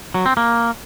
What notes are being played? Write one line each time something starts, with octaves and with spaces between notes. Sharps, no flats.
F#3
C4
A#3